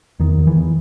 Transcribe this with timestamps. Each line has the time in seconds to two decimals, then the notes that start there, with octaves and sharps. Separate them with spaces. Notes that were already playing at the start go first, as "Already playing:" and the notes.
0.20 E2 D#3
0.37 E2
0.47 E3
0.55 E2